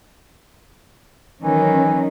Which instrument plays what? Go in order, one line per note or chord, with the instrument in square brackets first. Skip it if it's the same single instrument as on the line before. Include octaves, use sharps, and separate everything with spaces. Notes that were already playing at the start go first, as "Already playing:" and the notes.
[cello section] D#3 F#3 C#4 [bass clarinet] E3